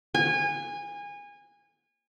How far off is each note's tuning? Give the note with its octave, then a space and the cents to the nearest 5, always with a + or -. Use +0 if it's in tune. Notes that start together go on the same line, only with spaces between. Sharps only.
G#5 -25